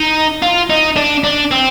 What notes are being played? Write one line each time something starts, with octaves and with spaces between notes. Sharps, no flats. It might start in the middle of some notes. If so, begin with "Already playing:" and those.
Already playing: D#4
F4
D#4
D4
D4
C4